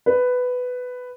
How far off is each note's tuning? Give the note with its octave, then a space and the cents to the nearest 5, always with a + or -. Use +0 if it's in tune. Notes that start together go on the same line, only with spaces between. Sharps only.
B4 +10